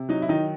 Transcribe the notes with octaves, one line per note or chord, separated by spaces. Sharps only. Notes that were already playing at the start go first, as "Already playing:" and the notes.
Already playing: C3
F#3 D#4
E4
D#3 D#4